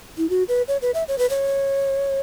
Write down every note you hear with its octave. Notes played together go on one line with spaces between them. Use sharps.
E4
F#4
B4
C#5
B4
E5
C#5
B4
C#5